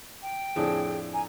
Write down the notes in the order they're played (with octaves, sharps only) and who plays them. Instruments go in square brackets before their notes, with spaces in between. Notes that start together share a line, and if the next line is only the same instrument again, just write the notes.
[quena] G5
[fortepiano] F2 A2 D4 [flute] G#4
[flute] G#5 [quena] A#5